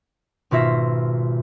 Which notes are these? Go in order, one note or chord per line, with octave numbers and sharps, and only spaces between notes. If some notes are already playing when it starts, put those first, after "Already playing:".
G#1 B2 F4 E5 A#6